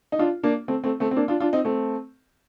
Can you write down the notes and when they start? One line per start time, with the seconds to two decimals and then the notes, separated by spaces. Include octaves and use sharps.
0.12 D#4
0.19 D4 F4
0.43 A#3 D4
0.68 A3 C4
0.84 A3 C4
1.00 A3 C4
1.11 C4
1.16 A#3 D4
1.28 D4 F4
1.40 D4 F4
1.53 C4 D#4
1.65 A3 C4